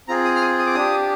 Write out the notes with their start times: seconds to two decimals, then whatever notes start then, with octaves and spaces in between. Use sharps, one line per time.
0.08 C4 F4 G#4 A#5
0.25 D#6
0.36 F6
0.41 D#6
0.59 D#6
0.66 D6
0.75 D4 G4 D#6